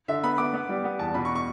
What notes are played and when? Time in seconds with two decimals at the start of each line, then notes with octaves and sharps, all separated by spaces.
0.08 D3 E5
0.23 B3 B5
0.38 B3 D6
0.54 B3
0.69 G3
0.84 B3
0.99 E2 A5
1.14 B2 B5
1.25 C#6
1.35 C#6